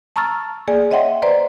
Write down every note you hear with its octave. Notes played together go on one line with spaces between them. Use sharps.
A5 A#5 C#6 E6 F6 A6
A#3 G#4 D5 G#5
C#5 D#5 E5 F#5 G5 C6
B4 C5 D5 A#5 C6